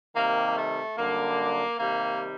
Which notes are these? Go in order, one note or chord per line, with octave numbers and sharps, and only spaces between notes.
C3 D#3 G3 A#3
A3
F#2 D3 G3 A#3
C3 D#3 G3 A#3